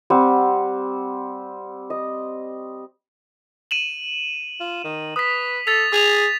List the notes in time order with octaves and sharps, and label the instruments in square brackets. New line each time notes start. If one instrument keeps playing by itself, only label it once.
[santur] G3 C4 F#5
D#5
[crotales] D#7 E7 F#7
[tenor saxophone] F4
D#3
[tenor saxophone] B4 [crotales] D#6 B6
[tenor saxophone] A4 [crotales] A6 B6 F7
[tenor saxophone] G#4 [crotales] D#6 F7